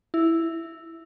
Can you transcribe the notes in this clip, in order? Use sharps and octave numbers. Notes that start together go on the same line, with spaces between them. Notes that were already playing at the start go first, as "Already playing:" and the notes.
E4